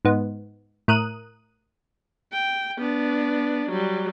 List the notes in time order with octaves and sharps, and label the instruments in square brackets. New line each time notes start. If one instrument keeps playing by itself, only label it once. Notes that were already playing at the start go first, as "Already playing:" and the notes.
[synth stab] G#2 B3
A2 A#4 D#6 F#6 D#7
[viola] G5
B3 D4
F#3 G3